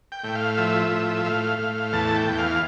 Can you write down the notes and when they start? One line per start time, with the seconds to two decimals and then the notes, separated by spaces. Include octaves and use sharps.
0.12 G5
0.24 A2
0.35 F5
0.57 F3 E5
0.91 A2
1.25 A2 F5
1.58 A2
1.92 E2 A5
2.16 G5
2.27 E2
2.38 F5